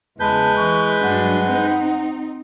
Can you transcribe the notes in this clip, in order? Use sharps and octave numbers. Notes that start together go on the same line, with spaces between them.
E2 C#3 G#3 B4 A5 G6
E3 C#6
G2 F#3 D4 F#5
C4 D#4